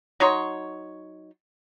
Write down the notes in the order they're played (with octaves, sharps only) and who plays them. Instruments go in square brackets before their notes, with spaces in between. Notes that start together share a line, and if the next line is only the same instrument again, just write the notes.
[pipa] F#3 D#4 C#5 C6